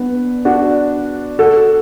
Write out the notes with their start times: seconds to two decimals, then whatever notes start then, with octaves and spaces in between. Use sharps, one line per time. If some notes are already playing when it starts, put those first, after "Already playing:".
Already playing: B3 D4
0.45 D4 F#4
1.39 F#4 A4